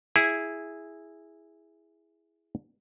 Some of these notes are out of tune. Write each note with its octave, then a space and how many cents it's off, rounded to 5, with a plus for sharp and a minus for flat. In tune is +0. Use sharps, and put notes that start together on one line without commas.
E4 +0 G#4 +0